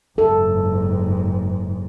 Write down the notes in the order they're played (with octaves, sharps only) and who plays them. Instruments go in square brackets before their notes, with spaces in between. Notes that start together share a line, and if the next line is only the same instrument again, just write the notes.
[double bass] F#1 G#2 [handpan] A4